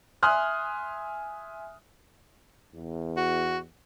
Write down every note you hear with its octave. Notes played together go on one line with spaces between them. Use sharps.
E5 G#5 C6 D#6 F6 F#6
E2
F#4